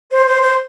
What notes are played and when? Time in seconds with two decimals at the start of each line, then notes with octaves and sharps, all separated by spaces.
0.11 C5
0.27 C5
0.41 C5